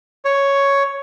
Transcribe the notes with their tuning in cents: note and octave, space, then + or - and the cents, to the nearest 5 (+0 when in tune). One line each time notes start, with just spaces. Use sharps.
C#5 +5